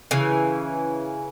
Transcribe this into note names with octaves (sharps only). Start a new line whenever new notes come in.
C#3 E3